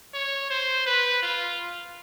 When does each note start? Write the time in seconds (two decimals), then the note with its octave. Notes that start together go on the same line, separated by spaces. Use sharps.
0.14 C#5
0.50 C5
0.87 B4
1.22 F4